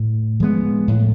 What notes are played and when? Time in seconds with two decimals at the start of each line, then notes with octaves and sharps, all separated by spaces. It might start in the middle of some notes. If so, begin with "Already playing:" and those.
Already playing: A2
0.40 F3 G#3 B3
0.88 A2